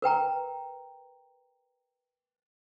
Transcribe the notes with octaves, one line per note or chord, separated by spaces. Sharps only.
A#4 B4 G5 A#5